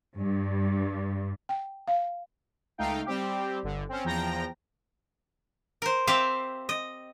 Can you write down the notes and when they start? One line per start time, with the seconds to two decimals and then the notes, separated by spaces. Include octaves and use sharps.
0.16 G2
1.49 G5
1.88 F5
2.78 C#2 A3 D#4 F5 G5
3.06 G3 C4 G4
3.63 G1 D3
3.89 C4 C#4
4.04 E2 F3 G5 A#5 A#6
5.82 A#4 C5
6.07 C4 G4 E5 F5
6.69 D#5